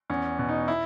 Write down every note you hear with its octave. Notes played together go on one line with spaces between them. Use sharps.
E2 C#4
B2
D#4
E4